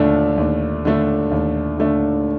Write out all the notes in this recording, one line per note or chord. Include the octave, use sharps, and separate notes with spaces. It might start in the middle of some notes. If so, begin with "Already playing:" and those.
Already playing: D#2 D3 A3 D4
D#2
D3 A3 D4
D#2
D3 A3 D4